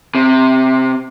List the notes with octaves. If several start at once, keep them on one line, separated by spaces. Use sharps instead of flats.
C3